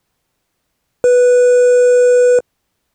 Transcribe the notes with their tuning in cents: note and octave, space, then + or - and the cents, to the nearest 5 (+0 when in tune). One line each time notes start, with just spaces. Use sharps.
B4 -5